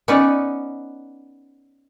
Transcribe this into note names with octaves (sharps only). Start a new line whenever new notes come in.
B3 C#4 D#4 C#5 D5